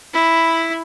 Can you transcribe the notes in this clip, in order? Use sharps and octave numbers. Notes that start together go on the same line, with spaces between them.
E4 B5